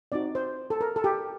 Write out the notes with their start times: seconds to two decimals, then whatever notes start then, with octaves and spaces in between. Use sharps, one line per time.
0.12 C4 D#4 F#4 D5
0.35 C5
0.70 A4
0.81 A#4
0.96 A4
1.04 G4